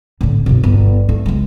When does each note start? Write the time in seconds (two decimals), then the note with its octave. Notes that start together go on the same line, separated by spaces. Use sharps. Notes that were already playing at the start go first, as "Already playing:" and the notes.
0.21 A2 D3
0.46 B1 F#2
0.64 G1
1.09 A3
1.26 C#2 G#3